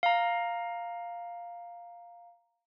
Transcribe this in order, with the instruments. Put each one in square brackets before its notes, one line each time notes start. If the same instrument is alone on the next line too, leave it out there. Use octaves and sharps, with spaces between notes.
[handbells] F5 A#5